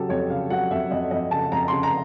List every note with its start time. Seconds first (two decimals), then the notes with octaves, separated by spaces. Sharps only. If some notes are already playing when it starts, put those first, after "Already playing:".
Already playing: C#3 F#3 G4 A4
0.09 F2 C#5
0.30 C#3 F5
0.50 F#3 F#5
0.71 F2 E5
0.91 F2 D#5
1.11 F2 D#5
1.31 C#3 A5
1.52 F2 A#5
1.68 C#3 C6
1.83 A#5